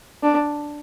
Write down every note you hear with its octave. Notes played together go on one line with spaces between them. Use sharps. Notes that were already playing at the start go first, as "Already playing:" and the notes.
D4